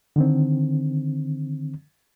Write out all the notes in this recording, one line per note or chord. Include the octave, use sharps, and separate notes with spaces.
D3 D#3 C4